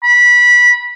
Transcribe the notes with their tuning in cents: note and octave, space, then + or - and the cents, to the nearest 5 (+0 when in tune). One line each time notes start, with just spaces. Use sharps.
B5 -20